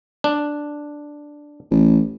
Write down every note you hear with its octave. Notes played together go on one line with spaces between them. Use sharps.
D4
A1